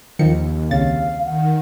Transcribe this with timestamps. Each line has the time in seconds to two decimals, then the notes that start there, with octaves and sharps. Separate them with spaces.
0.19 D#2 D#3 F3 C#7
0.71 C2 C#3 F5 A6
1.25 D#3 F#5